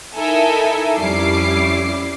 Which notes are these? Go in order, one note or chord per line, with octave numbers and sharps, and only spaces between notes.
D#4 E4 A4 A#4 E5 G#5
F2 G3 C#4 E4 D6 C7